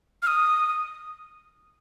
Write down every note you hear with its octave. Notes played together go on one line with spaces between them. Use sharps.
F6
D#6